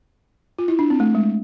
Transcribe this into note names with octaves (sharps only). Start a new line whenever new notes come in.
F4
E4
D4
C4
A3
G#3